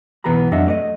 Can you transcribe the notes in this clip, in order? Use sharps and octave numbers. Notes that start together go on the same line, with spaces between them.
B1 E3 B3 G#4 A#5 B5
F2 F#3 D4 D#5 E5 F#5
A3 D5 D#5